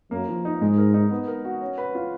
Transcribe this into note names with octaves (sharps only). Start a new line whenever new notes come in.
F#2 A#3
F3
D#4
G#2 G#3
A#4
D#4
B3
A#4
F#4
C#4
B4
F4